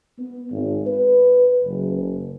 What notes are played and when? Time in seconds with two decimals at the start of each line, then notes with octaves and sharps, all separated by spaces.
0.19 B3
0.51 G#1
0.86 B4
1.64 F#1